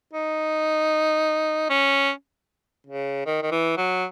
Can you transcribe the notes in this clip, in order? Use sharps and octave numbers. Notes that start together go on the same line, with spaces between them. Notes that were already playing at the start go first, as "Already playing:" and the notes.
D#4
C#4
C#3
D#3
D#3
E3
F#3